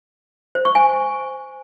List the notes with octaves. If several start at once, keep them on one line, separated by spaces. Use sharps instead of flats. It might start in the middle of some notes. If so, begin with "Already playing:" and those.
C5
C#6
G#5